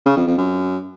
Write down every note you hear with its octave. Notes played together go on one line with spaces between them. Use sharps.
C#3
F2
F2
F#2